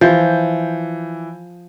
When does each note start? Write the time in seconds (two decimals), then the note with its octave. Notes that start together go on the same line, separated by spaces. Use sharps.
0.01 E3 F3 G6